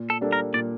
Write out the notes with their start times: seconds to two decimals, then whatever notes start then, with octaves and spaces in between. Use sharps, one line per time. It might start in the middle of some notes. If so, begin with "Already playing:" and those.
Already playing: A#2
0.10 A4
0.21 G3 A#3 D4 A4
0.32 A#4
0.54 A#2 D5